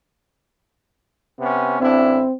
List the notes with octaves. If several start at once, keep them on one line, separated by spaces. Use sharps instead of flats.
C3 B3 C#4
A1 C4 D4 E4